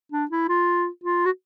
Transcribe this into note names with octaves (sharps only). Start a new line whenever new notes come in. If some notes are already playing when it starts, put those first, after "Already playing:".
D4
E4
F4
F4
F#4